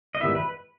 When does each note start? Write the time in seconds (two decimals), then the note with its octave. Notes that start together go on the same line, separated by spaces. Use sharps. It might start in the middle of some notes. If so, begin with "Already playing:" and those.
0.15 D#5
0.20 G#2 D#3 G3 B3 E4 E5
0.35 B4